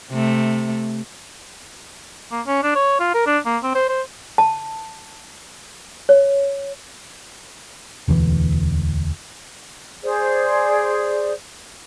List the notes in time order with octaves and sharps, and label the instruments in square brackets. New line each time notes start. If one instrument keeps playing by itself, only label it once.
[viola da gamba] C3 A3
[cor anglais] A#3
C#4
D4
C#5
F4
A#4
D4
A#3
C4
C5
C5
[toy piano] A5
C#5
[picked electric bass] E1 D2 E3
[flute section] G#4 C5 D5